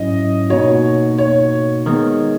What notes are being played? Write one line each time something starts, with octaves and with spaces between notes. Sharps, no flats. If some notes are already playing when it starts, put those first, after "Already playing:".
Already playing: G#2 F#3 C#4 E4 D#5
B2 A#3 D#4 F#4 C#5
C#5
D#3 G#3 B3